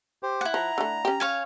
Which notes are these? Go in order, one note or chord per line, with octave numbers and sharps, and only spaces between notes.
G4 C5
E4 F#5
F3 A#5
D3 A3
C#4 G4
C#5 F5 G#5